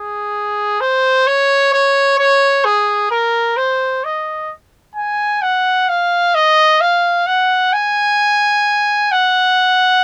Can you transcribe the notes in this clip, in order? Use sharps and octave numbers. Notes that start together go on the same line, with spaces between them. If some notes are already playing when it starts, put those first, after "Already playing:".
Already playing: G#4
C5
C#5
C#5
C#5
G#4
A#4
C5
D#5
G#5
F#5
F5
D#5
F5
F#5
G#5
F#5